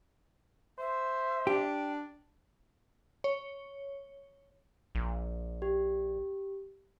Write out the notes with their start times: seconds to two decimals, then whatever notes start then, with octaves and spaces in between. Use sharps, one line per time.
0.79 C5 E5
1.47 D4 G4
3.24 C#5
4.95 A#1
5.62 G4